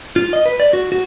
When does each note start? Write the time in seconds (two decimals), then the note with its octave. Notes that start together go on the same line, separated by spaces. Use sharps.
0.16 F4
0.33 D#5
0.46 B4
0.60 D5
0.73 F#4
0.92 F#4